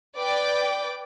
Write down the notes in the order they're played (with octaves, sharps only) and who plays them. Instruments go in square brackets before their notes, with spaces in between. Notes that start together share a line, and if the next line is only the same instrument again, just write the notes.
[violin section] B4 D5 G5 D6